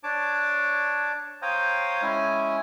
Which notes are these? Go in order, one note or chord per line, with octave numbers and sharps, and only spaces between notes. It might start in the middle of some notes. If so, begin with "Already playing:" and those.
D4 C#5 A5 D6
C5 C#5 F5 G5 A#5 D#6
G#3 C#4 E4 G#5